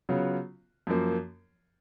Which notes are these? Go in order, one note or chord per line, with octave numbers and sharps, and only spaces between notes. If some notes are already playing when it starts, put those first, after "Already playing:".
C#3 F#3 B3 F4
F#2 F3 A#3